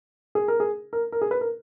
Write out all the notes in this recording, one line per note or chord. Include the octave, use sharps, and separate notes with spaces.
G#4
A#4
G#4
A#4
A#4
G#4
B4
A#4